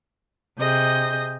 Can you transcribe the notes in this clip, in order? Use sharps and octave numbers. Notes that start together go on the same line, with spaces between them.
C3 G#4 D#5 G6